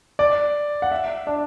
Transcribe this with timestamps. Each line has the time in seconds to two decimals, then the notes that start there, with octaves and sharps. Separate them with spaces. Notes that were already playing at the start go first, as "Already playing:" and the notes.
0.19 D5
0.82 F#5
0.91 E5
1.27 D4